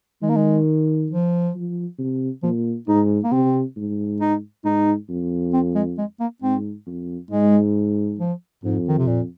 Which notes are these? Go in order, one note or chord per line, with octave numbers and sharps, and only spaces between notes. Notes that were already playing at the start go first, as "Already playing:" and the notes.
D#3 G#3
A#3
G#3
F3
F3
C3
A#2 F3
G#2 D#4
A#3
C3 C4
G#2
D#4
G#2 D#4
F2
C4
G#3
G#3
A#3
G#2 C4
F2
G#2 G#3
F3
F2 G#2
D#3
C3
A#2